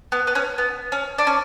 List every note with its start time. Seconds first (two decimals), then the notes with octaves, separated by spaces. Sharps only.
0.12 B3
0.27 B3
0.35 C#4
0.58 B3
0.92 C#4
1.18 D4
1.27 C#4